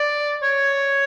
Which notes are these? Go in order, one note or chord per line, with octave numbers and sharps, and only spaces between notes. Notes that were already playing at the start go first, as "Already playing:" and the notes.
Already playing: D5
C#5